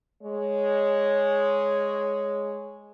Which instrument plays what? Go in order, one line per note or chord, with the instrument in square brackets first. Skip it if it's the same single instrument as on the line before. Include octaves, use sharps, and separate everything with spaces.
[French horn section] G#3 C#5